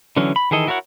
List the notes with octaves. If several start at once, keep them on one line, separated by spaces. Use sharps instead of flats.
D3 E3 F#3 C#4
B5
D#3 E3 G#4 A4 D#5
E4 F#4 A#4 C#5 F#5